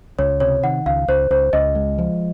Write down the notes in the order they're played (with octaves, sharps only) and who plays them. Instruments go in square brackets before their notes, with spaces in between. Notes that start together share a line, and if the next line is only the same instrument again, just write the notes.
[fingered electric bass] C#2 [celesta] C#5
[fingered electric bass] C3 [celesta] C#5
[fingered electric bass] D#3 [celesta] F#5
[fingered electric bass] C#2 [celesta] F5
[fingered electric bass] C#2 [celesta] C5
[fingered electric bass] C#2 [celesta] C5
[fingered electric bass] C#2 [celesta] D#5
[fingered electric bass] G#3
F3